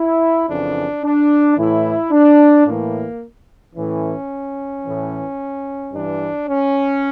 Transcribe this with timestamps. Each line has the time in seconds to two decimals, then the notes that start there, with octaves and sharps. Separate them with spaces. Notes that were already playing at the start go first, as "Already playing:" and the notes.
Already playing: E4
0.48 F2 C#3 E3 D4
1.03 D4
1.57 A2 E3 E4
2.12 D4
2.66 A2 E3 A#3
3.75 A2 E3 C#4
4.84 A2 E3
5.93 G2 E3 D4
6.47 C#4